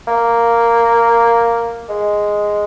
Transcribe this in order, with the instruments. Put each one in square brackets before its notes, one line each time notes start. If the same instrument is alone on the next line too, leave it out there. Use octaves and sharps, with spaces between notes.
[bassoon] A#3
G#3